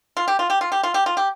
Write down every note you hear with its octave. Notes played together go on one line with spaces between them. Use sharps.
F4
G4
F4
G4
F4
G4
F4
G4
F4
G4